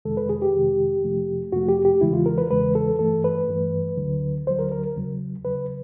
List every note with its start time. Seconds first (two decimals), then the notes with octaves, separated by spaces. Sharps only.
0.05 F2 C3 D#3 G#3 A4
0.17 B4
0.29 G#4
0.42 G4
0.54 F2 C3 D#3 G#3
1.03 F2 C3 F3 A3
1.52 F2 C3 F3 A3 F#4
1.69 G4
1.85 G4
2.01 E2 C#3 E3 G#3 E4
2.13 F4
2.26 A#4
2.38 B4
2.50 E2 C#3 E3 G#3 B4
2.75 A4
2.99 G2 E3 A3 A4
3.24 B4
3.48 G2 E3 A3
3.97 D2 D3 F#3
4.46 D2 D3 F#3 C5
4.59 A#4
4.72 A#4
4.96 D#2 C#3 F#3
5.45 D#2 C#3 F#3 B4